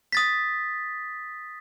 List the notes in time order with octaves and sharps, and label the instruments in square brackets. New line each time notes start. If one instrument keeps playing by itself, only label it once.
[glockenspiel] D#6 A6 B6